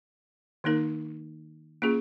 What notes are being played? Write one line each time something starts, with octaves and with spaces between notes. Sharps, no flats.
D#3 A#3 D#4 A#4
A#3 C#4 F4 G#4